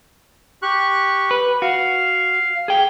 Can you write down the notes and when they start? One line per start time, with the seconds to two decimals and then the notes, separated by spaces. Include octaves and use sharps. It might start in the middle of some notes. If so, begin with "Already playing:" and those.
0.62 G4 C#6 F#6
1.31 B4
1.62 F#4 F5
2.68 G#4 G5